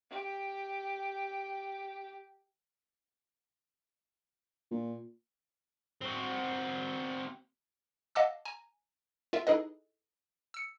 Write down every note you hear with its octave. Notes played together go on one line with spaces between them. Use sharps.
G4 G5
A#2
C4 F#4
D#5 F5 F#5 A5 D6 E6
G#5 A#5
F4 A#4 E5
D#4 E4 G#4 A4 B4 D#5
E6 C#7